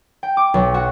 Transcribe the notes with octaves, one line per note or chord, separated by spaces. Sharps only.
G5
D6
B1
F#4